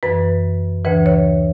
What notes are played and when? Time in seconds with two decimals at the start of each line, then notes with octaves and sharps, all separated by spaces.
0.03 F#2 E3 B4
0.85 D2 C#3 E3 B4
1.06 C#5